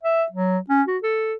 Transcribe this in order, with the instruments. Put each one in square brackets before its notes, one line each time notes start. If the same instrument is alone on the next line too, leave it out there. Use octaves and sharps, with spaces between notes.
[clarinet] E5
F#3
C#4
F#4
A4